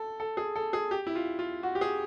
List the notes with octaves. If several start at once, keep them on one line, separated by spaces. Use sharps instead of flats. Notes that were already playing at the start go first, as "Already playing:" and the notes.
Already playing: A4
A4
G#4
A4
G#4
G4
E4
F4
F4
F#4
G4
G#4